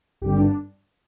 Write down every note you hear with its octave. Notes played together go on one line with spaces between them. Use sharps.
G#1 G2 D3 G3 G4
D4